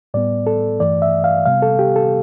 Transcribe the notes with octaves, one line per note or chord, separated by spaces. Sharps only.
A2 G3 B3 D5
A4
G2 E3 A3 D5
E5
F5
C3 G3 B3 F5
A4
G4
A4